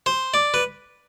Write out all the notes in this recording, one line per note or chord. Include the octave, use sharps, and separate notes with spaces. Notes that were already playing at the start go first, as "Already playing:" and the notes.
C5
D5
B4